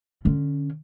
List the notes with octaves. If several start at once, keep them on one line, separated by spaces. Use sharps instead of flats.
D3 C#4